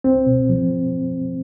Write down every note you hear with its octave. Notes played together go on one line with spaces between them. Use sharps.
C#2 C4
B2
F3